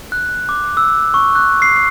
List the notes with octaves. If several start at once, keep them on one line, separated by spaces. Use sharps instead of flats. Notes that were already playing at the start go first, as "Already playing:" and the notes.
F#6
D6
E6
C#6
F#6
C7